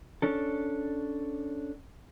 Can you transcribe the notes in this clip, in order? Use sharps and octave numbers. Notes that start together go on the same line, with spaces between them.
C#4 D4 A4